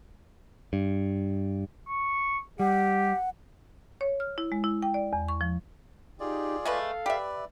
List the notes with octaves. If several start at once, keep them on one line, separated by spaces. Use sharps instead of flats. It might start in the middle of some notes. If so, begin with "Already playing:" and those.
G2
C#6
G3 G4 F#5
C#5
F6
E4
G#3
E4
G5
D5
E2
C#6
F3
D#4 F4 G4 G#4 D5
G#3 A3 A4 B4 F5
G4 B4 D5 E5